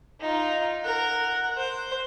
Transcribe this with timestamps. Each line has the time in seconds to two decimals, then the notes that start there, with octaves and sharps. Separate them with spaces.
0.21 D#4 F4
0.84 A#4 F#5
1.57 C5